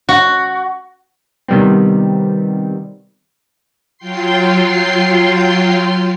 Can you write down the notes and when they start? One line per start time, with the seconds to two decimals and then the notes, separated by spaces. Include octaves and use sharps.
0.09 F#4
1.48 C3 D#3 G3 B3 C4
3.98 F#3 F4 G5 C6 C7